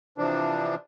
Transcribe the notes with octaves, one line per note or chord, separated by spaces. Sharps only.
C3 E3 F3 D4